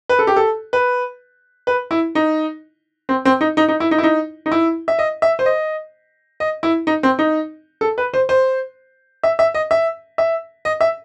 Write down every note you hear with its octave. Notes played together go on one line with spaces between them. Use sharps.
B4
A4
G4
A4
B4
B4
E4
D#4
C4
C4
D#4
D#4
D#4
E4
D#4
E4
D#4
D#4
E4
E5
D#5
E5
C5
D#5
D#5
E4
D#4
C4
D#4
A4
B4
C5
C5
E5
E5
D#5
E5
E5
D#5
E5